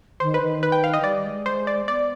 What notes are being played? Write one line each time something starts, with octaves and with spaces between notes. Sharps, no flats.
D#3 C5
B4
D#3
B4
G5
F5
D#5
G3 D5
G#3
C5
D5
B3 D5